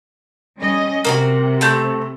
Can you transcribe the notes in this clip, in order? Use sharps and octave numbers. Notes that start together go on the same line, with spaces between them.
G3 C#4 D#5
C3 A#3 D4 F#4
A3 C4 G6